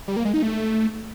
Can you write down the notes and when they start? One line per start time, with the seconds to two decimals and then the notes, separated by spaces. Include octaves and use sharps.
0.08 G3
0.16 A#3
0.25 G#3
0.34 D#4
0.42 A3